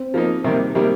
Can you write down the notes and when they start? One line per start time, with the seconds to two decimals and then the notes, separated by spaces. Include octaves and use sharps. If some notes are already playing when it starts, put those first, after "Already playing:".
Already playing: C4
0.14 F3 A#3 D#4
0.44 C3 D#3 G3 A#3
0.75 C3 D#3 G3 A#3